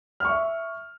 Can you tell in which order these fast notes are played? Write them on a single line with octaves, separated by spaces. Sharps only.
F6 C#6 E5